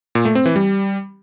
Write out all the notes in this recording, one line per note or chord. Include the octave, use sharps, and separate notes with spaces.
A#2
A3
C4
E3
G3